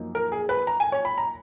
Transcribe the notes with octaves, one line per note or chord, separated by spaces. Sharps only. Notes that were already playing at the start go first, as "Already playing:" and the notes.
Already playing: F#2 F3 A#3 D#4
A#4
G#4
B4
A#5
G#5
C#5
B5
A#5